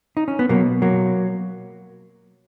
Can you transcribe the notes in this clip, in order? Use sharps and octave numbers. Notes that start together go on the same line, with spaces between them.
D#4
C#4
B3
B2 F#3 A#3
F#3 A#3